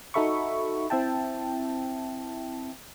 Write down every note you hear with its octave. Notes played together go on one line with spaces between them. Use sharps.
D#4 F#4 A4 E5 B5 C#6
C4 E4 E5 G5 A5